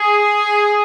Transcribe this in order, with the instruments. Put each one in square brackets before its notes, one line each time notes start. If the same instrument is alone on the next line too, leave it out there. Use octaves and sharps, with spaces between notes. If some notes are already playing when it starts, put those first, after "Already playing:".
Already playing: [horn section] G#4